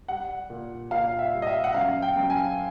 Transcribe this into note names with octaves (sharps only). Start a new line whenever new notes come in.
G3 F#5
A#2
A#2 F5
E5
G3
D#5
E5
F#5
F#2 F5
G5
F#2
G#5